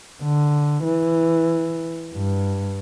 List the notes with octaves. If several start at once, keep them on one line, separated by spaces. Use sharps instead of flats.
D3
E3
G2